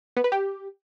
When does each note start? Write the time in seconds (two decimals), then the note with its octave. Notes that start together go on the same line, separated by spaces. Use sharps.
0.17 B3
0.24 B4
0.32 G4